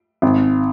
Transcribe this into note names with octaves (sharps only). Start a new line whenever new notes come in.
G#1